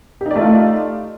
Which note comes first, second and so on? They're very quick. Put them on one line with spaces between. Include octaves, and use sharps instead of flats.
G4 D#4 D5 A3 F4